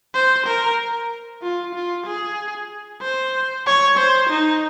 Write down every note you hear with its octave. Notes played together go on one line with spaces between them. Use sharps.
C5
A#4
F4
F4
G#4
C5
C#5
C5
D#4